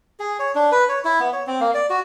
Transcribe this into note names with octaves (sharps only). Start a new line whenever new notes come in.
G#4
C#5
D4
B4
C#5
E4
B3
C#5
C4
A#3
D5
F#4